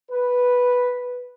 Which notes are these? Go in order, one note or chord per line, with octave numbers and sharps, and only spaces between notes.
B4